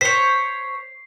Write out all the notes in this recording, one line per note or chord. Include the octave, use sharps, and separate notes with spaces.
C5 C#5 B6 C7